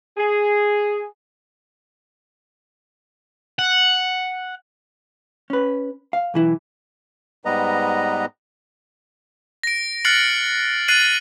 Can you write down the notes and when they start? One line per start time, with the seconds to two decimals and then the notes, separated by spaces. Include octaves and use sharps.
0.18 G#4
3.59 F#5
5.50 C#4 B4
6.13 F5
6.34 B1 E3 E4
7.45 G#2 G3 B3 B4 D#5 A#5
9.63 A#6 D7
10.05 F6 F#6 A6 C7 C#7 F#7
10.88 F#6 A6 C7 D#7 F#7